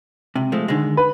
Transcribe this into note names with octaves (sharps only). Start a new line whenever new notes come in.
C#2 C3
F3 G#3 A3
D3 D#3 G#3
B4